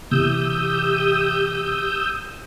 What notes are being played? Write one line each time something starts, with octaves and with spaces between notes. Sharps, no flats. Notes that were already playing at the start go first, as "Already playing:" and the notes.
C3 E3 G4 D#6 E6 G6